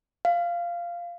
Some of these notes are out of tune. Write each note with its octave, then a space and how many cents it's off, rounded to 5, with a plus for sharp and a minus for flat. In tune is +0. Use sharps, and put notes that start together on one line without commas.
F5 -10